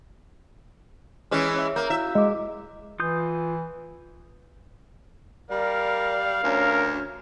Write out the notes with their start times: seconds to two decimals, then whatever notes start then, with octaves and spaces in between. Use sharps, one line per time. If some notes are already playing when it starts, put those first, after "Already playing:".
1.31 E3 G#3 C#4
1.56 C#5 E5
1.76 A#3 G6
1.90 E4 F#4 E5 F5
2.15 G#3 G#4 D6
3.00 E3 F4 D#6 G6
5.51 G3 A#4 D5 F5
6.43 D2 C#4 A#4